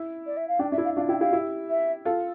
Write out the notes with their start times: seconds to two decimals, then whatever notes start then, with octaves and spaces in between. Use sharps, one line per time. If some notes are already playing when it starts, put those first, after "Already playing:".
Already playing: E4
0.26 D5
0.37 E5
0.48 F5
0.59 D4 G5
0.72 D4 E5
0.78 E4
0.84 F5
0.96 D4 F4 F5
1.09 E4 G5
1.21 E4 G4 F5
1.33 E4 G4
1.70 E5
2.05 F4 A4